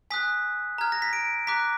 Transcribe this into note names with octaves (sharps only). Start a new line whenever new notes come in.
G#5 D#6 F#6 B6
A#5 F6 G#6
A#6
B6
D7
A#5 D6 F#6 B6